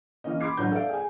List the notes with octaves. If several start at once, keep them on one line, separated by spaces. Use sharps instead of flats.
E3 A#3 C#4 D#5
B5 C6 D6 G#6 C7
A1 F#3 D4 B4 C#5 G6
A4 D5 E5 F5 D7
G#4 G#5